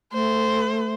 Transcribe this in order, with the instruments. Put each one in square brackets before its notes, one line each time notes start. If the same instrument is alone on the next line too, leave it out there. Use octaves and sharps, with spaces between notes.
[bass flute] A3 [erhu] C5